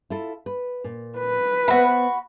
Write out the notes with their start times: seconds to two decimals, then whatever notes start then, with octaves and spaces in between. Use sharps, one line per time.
0.10 E4 F4 A4
0.46 B4
0.84 A#2
1.18 B4
1.68 B3 F#4 C5 E5 B5